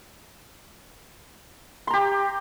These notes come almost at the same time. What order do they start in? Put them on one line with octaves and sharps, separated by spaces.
C6 A#5 G4